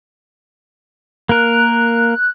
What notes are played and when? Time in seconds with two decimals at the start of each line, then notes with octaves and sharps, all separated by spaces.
1.29 A#3 A#4 F#6